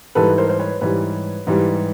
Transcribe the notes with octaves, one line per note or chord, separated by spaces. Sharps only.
G#2 E3 G3 A4 B4
A#4 C5
C5
B4 C#5
G#2 E3 G3 B4 C#5
G#2 E3 G3